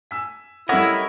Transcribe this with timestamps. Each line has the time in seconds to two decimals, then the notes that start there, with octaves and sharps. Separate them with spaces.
0.11 G#5 E6 B6
0.69 G3 C#4 E4 A4 A#4 C#5 D#5 F#5